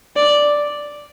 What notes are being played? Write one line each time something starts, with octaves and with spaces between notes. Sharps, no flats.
D5